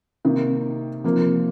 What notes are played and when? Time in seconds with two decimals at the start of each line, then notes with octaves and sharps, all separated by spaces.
0.25 C3 D#3 A#3
1.04 C3 F3 A#3